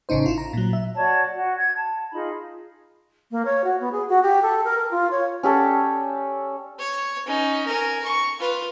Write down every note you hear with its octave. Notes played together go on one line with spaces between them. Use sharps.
A1 C#3 C#4 D#4 C5
E4 F4
A#5
A#2 F#3
E5
F#4 C#5 D5 A5
F#4
G#6
A5
D#4 F4 G#4 B5
A#3
C#5
F#4
B3
G#4
F#4
G4
A4
A#4
A#4
F4
C#5
C#4 G4 A4 D5
C#5
C#4 D#4
A#4 G#5
C#6
F4 B4